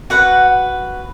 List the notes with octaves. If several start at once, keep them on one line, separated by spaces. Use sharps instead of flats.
F#4 B4 F#5